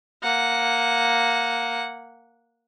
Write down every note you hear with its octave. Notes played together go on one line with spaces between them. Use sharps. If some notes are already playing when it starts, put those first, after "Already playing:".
A#3 F#5